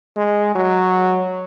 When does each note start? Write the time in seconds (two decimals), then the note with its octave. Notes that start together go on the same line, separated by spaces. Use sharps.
0.17 G#3
0.55 F#3